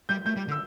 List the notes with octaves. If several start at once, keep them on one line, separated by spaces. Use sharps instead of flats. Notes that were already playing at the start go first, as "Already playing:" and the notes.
G3 G6
A3 G6
G3
D3
E6